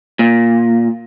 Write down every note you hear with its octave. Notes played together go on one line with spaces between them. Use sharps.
A#2